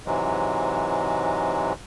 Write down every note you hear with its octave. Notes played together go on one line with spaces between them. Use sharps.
G#2 C3 E3 F#3 G#3